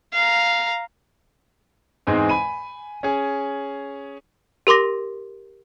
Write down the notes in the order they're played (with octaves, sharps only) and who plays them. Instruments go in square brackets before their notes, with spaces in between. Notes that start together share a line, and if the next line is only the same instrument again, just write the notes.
[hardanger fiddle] F5 A#5
[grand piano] E2 G#2 G#3 C4
G#5 B5 D#7
C#4 G#4
[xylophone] G4 A#4 C6 D6 A#6